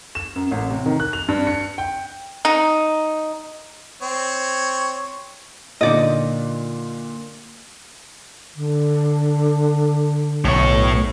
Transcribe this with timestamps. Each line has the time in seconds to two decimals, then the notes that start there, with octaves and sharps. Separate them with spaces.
0.15 E7
0.36 F#2
0.51 A1
0.70 C3
0.86 D#3
1.00 F#6
1.13 F7
1.28 G2
1.47 C#7
1.78 G5
2.45 D#4
4.02 C4 C#5
5.81 A#2 D3 D#4 D5 D#5
8.55 D3
10.45 B1 A2 C#5